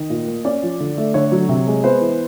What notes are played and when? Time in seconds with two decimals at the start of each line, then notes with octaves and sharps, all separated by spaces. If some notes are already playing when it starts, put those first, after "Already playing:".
Already playing: D#3 D#5
0.10 A#2
0.28 A#3
0.45 C#4 D5
0.63 F3
0.80 D3
0.98 A3
1.14 D3 C#5
1.32 F#3
1.49 C3
1.67 G#3
1.84 B3 C5
2.01 E3